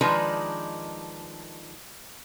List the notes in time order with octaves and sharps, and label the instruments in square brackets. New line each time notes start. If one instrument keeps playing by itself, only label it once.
[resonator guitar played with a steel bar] D#3 F3 G#3 D4 D#4 B4